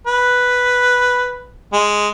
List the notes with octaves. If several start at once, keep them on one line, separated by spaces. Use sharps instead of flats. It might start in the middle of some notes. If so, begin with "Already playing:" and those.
B4
G#3